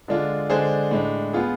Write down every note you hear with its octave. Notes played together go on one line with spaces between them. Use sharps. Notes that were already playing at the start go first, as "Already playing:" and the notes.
D3 G#3 D4 F4
D3 G#3 D4 G#4 C5
A2 G#3 D4
B3 F4 G#4